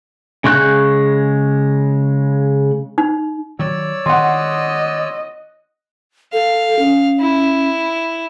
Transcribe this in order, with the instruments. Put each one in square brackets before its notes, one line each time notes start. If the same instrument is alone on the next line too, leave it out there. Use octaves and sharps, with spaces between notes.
[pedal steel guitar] C#3 G#3 C#6 F#6 G6
[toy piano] D#4
[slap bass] D#3 F#3 [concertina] C#5 D5 E6
[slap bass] D#3 [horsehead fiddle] D#5 [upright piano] F#5 C6
[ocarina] A4 [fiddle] F5
[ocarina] C#4
[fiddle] E4